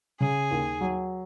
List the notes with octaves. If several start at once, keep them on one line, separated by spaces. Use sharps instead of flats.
C#3 G#4
D#2
F#3